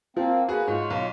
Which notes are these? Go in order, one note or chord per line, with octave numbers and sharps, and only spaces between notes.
F3 A#3 C4
A#3 F#4 G#4 B4
G#2 F4 C#5
B1